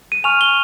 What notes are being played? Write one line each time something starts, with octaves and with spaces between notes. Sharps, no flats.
D#7
G#5 C#6 F6 F7
G7